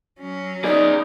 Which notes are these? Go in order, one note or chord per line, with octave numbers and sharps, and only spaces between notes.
F#3 C#4
D#4 G#4 D5